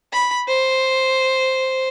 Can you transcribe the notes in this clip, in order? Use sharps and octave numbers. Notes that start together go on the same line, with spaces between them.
B5
C5